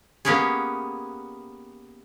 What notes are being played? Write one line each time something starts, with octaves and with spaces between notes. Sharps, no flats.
A#3 B3 C#4 G4 G#4